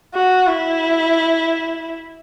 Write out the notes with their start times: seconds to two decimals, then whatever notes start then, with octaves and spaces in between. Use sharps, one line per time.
0.14 F#4
0.47 E4